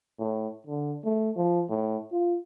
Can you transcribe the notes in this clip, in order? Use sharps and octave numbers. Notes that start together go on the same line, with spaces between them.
A2
D3
A3
F3
A2
F4